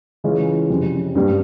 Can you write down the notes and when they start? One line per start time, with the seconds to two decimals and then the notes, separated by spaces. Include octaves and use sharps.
0.24 C#3 E3 G#3 C#4 F4
0.70 F2 C3 G3 C#4
1.15 G2 G3 A#3